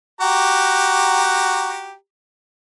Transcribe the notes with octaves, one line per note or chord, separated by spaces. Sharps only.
F#4 G4 A#5